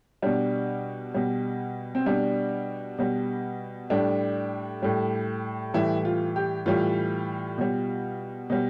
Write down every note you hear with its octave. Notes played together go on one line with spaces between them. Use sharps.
B2 G3 D4
B2 G3
C4
B2 G3 D4
B2 G3
A2 G3 D4
A2 G3
A2 E3 G3 E4
F4
G4
A2 E3 G3 F4
B2 G3
B2 G3